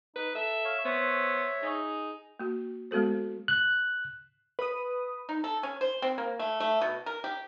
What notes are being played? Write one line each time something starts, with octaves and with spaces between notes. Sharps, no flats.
D#4 B4
A4 E5
C#5 F5
B3 C5 C#5 E5
D#4 G#4
A#3 F#4
G#3 B3 F#4 A4 C5
F#6
B4 D#6
D#4
A4
C#4
C5
C4
A#3
A3
A3
B2
A#4
G4